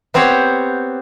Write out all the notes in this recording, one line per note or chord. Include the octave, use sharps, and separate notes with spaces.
B3 C4 G4 C5 C#5 F#5